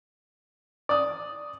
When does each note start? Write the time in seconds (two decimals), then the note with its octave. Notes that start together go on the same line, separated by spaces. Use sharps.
0.89 D5 D#6